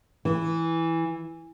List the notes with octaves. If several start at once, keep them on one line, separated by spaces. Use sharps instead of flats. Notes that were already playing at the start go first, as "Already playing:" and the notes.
E3